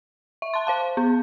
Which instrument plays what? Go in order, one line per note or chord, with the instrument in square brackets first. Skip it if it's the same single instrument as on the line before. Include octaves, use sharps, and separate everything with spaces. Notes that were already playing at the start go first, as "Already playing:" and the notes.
[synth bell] E5
A5 C6
C5 F5 A5
B3